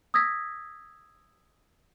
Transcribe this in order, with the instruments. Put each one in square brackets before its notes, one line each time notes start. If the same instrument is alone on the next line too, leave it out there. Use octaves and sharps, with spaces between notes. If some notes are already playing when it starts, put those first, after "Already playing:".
[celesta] D#6 E6 G#6 A#6 B6